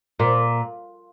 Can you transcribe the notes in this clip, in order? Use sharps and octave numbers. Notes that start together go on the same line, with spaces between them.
A#2